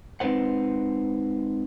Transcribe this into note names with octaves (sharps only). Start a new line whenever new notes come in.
G#3 C4 D#4 B4 C5 F#5